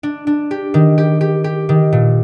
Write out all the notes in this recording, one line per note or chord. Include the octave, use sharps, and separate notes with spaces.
D4
D4
G4
D#3
G4
G4
G4
D#3
A#2